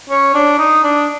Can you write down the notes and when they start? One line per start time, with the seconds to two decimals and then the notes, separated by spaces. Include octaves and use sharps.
0.10 C#4
0.34 D4
0.59 D#4
0.84 D4